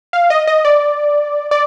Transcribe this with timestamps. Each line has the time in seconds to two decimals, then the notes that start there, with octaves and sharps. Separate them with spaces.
0.13 F5
0.30 D#5
0.47 D#5
0.65 D5
1.51 D5